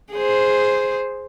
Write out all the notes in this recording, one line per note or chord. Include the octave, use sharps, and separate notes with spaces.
G#4 C5